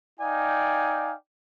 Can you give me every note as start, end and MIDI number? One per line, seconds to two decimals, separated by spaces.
0.20 1.13 63
0.20 1.13 74
0.20 1.13 77
0.20 1.13 79
0.20 1.13 80